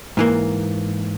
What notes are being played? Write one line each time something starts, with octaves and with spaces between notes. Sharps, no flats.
G#2 E3 A#3